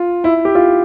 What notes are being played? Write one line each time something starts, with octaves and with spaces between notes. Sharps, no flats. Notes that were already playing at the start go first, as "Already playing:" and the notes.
Already playing: F4
E4
G4
F4